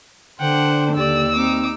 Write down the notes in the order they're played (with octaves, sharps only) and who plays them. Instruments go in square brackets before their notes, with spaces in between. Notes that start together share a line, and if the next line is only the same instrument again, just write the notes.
[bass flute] D3 [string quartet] D4 C5 [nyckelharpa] F#5 G5
[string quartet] D#2 E6 [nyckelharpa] G4 D5
[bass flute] C4 [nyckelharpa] D#4 D6